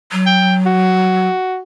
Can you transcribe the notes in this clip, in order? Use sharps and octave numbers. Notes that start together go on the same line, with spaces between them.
F#3
G5
F#4